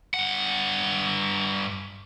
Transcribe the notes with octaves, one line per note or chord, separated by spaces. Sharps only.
G2 F#5